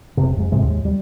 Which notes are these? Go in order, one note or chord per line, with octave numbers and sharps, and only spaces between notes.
E1 F2 C3
F2 G#3
G#2 C3 G#3
D#2
G3